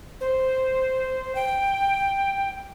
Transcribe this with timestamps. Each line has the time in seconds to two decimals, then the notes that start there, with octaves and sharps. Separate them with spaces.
0.21 C5
1.35 G5